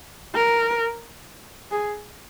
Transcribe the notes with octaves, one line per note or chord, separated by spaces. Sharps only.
A#4
G#4